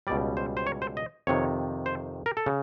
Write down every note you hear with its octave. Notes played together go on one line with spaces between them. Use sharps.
C#2 B2 G3 D5
C5
C5
C#5
C5
D#5
F2 C3 D#3 C#5
C5
A#4
A4
C#3